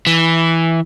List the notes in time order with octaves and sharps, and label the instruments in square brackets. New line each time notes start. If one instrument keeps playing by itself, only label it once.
[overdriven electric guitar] E3